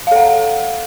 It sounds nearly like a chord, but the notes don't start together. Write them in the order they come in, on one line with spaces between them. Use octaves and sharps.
F5 A4 F#5